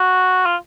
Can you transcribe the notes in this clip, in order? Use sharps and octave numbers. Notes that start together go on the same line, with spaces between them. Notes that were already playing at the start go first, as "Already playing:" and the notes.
Already playing: F#4
F4